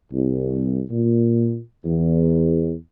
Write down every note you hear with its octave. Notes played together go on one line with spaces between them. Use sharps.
C2
A#2
E2